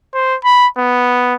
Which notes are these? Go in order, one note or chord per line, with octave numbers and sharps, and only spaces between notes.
C5
B5
B3